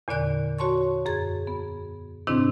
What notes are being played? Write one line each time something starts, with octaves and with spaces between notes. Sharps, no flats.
E2 A#2 D3 D5 F#6
F#4 C#5 A5 C6 C#6
F#2 G#4 G#6 A6
B3
G#2 C3 D#3 C4 D4 E4